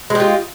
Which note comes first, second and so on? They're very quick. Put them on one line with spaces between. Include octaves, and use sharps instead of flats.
G#3 G4 F4